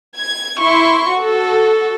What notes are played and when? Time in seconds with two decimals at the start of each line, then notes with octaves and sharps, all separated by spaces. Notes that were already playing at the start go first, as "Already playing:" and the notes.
0.18 G#6
0.60 E4 C6 C#6
1.14 F#4 A4